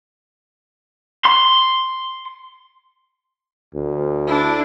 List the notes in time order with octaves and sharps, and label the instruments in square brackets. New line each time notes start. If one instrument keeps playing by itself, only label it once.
[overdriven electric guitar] C6
[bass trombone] D2
[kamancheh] D4 E4